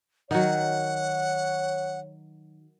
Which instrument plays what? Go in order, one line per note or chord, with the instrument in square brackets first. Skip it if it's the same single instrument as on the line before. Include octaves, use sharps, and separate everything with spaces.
[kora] D#3 F#3 [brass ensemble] C#5 [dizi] F#5